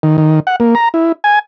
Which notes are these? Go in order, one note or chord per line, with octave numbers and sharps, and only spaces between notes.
D#3
D#3
F#5
A#3
A#5
E4
G#5